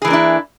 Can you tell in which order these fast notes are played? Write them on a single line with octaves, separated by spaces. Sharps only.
G#4 E3 A#3 D4 E4